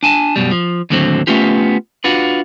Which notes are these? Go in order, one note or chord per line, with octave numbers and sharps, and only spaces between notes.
D4 G#5 A5
F#2 B2 G3
F3
D#2 A2 D3 F#3 C4
A3 B3 C#4 F4 G4
D4 F4 F#4 B4